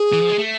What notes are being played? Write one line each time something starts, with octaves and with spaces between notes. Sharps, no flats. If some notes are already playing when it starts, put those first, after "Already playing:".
Already playing: G#4
E3
F3
G#3
A3